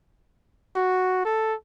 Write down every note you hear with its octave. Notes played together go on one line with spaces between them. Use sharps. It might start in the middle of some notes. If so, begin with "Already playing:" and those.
F#4
A4